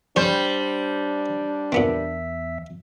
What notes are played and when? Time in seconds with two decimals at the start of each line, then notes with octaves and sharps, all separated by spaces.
0.16 G3 D4 C5 C#5 G#5
1.72 E2 A#2 B3 C4 E5